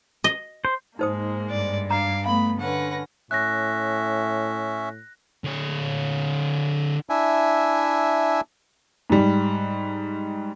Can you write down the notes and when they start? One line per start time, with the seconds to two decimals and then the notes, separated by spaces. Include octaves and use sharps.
0.24 D#5
0.65 C5
0.99 G#2 G#3 A#3 D#4 C5 D#6
1.50 G2 D5
1.90 D4 F5 A#5 D6
2.26 A3 B3 F5 B5
2.60 D3 C#4 B4 F#5 A#6
3.31 A2 C#4 E5 F#6 A#6
5.44 D3 C#5
7.10 D4 E4 E5 G#5
9.10 G#2 G3